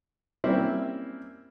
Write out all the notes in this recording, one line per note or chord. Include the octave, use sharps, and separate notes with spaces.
G3 A#3 C4 C#4 E4